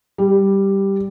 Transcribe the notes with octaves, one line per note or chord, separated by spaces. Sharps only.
G3